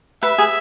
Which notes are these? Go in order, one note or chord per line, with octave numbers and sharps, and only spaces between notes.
B4 E5
G#4